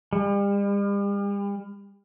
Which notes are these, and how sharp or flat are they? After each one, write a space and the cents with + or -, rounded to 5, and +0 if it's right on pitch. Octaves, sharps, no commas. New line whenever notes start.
G3 +40